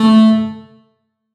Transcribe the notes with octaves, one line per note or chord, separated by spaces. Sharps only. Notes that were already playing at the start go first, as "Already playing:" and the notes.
Already playing: A3